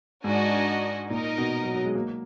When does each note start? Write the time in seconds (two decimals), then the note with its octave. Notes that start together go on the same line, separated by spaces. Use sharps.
0.23 G#2 D4 F#4 A#4 D#5 G#5
1.09 A#2 D#4 A#4 D#5
1.38 B2
1.64 F#3
1.74 F#3
1.85 G#3
1.95 A#3